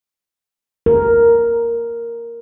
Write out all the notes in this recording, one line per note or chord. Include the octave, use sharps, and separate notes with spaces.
A#4